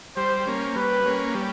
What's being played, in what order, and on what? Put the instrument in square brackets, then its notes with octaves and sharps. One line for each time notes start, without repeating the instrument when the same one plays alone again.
[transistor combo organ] G3 [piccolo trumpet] C5
[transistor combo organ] A#3 C#4
[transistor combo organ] G3 [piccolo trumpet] B4
[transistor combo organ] A#3 C#4
G3